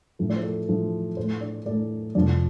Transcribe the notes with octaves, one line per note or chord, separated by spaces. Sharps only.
A2 F3 A3
D5
C5
A4
A2 F3 A3
A2 A3 C5
D5
A2 A3 D5
F2 C3 F3 D5